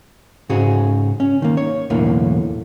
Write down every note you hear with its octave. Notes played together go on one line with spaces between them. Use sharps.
G#2 C#3 F#4 G#4
C#4
D#3 A#3
C#5
B1 E2 A2 D3 A#3